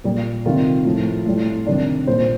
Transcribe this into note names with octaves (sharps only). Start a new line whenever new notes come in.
A#2 G3
C3 D#3 G3 F4
A2 F3
A2 G3
C3 D#3 G3 D4
A#2 G3 C5